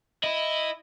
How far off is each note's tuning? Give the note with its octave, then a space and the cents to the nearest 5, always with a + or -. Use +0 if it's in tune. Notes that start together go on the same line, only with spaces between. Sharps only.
E4 +0 D#5 +0